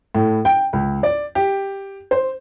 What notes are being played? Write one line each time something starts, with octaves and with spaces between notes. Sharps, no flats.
A2
G5
C#2
D5
G4
C5